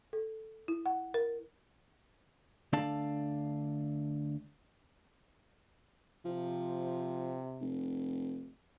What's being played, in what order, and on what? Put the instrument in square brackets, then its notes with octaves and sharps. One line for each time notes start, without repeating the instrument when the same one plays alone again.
[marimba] A4
E4
F#5
A#4
[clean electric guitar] D2 D4 A4 D5 F5 A5
[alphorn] C3 [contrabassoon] F3
[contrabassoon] F1